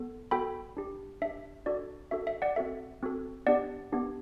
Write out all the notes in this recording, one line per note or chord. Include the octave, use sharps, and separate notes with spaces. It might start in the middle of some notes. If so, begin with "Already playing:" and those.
Already playing: B3 A4
B3 F#4 A4 G5 B5
D4 G4
D4 G4 E5
D4 F#4 A4 D5
D4 F#4 A4 E5
E5
D5 F#5
C4 F#4 A4 E5
C4 F#4 A4
B3 D4 G4 D5 F#5
B3 D4 G4